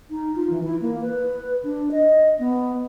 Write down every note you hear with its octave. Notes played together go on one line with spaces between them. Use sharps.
D#4
F4
E3
E4
A#3
B4
D4
D#5
B3